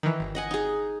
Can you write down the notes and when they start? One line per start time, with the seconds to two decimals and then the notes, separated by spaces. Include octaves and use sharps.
0.03 D#3 E3
0.20 G1
0.35 D#5 F#5 G#5
0.51 D#4 G#4